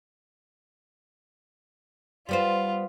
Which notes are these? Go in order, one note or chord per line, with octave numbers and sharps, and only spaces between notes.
G3 B3 F4 C5